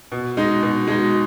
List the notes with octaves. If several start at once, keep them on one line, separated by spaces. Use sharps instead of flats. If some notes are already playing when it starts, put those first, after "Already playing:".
B2
G#3 D#4
B2
G#3 D#4